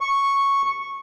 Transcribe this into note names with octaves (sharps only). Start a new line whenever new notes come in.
C#6